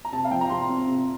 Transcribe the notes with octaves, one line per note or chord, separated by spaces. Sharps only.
A#5
C3 A5
F5
F3 G5
A#5
C3 C6
C4
C3